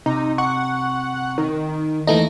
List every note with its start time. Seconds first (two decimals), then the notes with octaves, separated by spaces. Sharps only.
0.06 C3 D#4
0.38 F#5 C#6
1.38 D#3
2.07 D#2 E3 A3 D#4 A#6